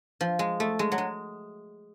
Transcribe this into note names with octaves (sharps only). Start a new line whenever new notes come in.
F3
G#3
A3
G#3
F#3
G#3